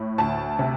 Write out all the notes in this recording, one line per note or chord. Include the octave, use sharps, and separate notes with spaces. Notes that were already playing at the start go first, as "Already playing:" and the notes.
Already playing: A2
D2 A5
C3